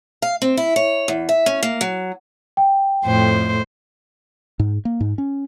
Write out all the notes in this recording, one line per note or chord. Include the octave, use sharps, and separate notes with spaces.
F5
C4
E4
C#5
E2
E5
C#4
A#3
F#3
G5
F2 A2 C5
G#2
A#3
G#2
C#4